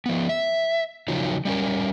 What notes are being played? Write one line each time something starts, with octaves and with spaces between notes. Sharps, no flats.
F3 B3
E5
C#3 F3 F#3 D#4
G3 C#4 A#4